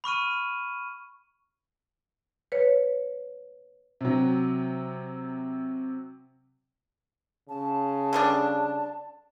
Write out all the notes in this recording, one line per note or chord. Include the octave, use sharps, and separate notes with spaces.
B5 C#6 F6 D#7
B4 C#5
C3 F#3
C#3 A5
D3 G3 D4